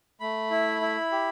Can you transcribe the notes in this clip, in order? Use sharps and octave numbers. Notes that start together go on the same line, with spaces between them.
A3 B5
E4
E4
G4